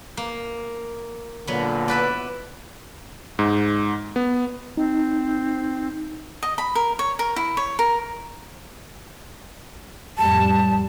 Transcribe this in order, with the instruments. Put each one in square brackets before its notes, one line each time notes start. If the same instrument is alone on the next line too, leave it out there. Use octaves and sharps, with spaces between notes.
[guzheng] A#3
[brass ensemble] A#2 D3 [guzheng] F#3 B3
[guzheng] E4 B4 D5
[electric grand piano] G#2
B3
[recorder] C4 [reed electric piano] D#4
[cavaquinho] D#5
B5
A#4
C#5
A#4
E4
C#5
A#4
[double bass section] F2 A2 G3 [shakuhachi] A5